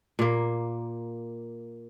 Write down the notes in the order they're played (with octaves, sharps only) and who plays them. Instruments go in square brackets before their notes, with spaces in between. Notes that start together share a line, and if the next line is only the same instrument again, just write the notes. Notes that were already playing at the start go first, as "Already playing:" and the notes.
[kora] A#2 A#3